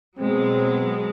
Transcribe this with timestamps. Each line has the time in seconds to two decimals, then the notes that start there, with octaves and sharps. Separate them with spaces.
0.18 B2 F#3 G#3 C4